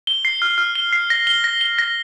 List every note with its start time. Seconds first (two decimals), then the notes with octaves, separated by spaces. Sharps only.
0.07 G7
0.25 C7
0.42 F6
0.58 F6
0.75 G7
0.93 C7
1.10 A#6
1.27 G7
1.44 A#6
1.61 G7
1.78 A#6